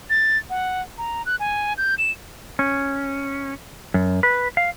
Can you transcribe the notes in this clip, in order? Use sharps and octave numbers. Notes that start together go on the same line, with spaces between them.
A6
F#5
A#5
F#6
G#5
G6
E7
C#4
F#2
B4
F5